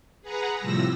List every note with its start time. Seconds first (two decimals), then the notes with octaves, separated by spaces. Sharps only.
0.22 G#4 B4 F#5 A#5
0.58 A2 C3 F3 G3 E6 A#6